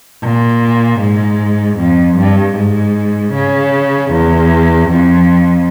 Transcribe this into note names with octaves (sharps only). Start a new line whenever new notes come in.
A#2
G#2
F2
G2
G#2
C#3
E2
F2